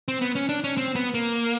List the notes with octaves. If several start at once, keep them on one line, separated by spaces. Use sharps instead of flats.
C4
B3
C#4
D4
C#4
C4
B3
A#3